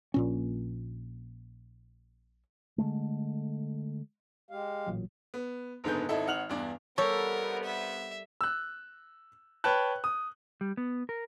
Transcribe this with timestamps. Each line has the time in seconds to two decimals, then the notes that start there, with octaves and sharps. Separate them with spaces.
0.14 A#1 A#2 C#4
2.78 D3 F3 G#3 A3
4.51 G#3 G4 F5
4.87 A1 A#2 F#3
5.34 B3
5.84 F#1 G#2 D3 B3 G6
6.09 G#1 D#4 E4 A4
6.27 G#1 F#5 F6 F7 F#7
6.49 E2 G2 D4 D6
6.98 G2 C3 G3 B3 A4 A#4 C#5
7.64 E5
8.41 E6 F#6
9.64 B4 C#5 G5 A5 F#6
10.04 D#6
10.61 G3
10.77 B3
11.09 A#4